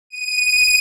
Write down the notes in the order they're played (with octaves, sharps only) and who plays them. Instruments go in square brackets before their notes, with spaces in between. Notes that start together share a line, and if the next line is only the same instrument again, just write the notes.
[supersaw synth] D#7